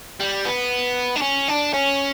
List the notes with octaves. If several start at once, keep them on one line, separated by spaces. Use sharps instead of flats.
G3
B3
D4
C#4
D4
C#4